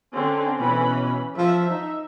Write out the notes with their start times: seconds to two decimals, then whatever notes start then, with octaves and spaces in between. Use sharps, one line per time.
0.14 D3 C4 C#4
0.60 B2 E3 C#4 B5
1.37 F3 E5
1.70 D#4